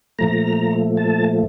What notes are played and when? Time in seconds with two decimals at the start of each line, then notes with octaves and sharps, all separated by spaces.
0.19 A#2 F3 A3 A#5
0.97 A5